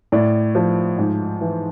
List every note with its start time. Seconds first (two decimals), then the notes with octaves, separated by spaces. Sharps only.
0.12 A2 D5
0.55 F3
0.99 G#2
1.41 E3